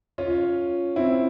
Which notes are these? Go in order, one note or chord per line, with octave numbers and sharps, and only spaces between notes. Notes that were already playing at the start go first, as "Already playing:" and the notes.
C#4 F4
C4 E4